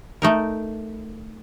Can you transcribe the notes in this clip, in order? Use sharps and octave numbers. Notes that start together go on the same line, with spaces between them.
A3 D#4 A#4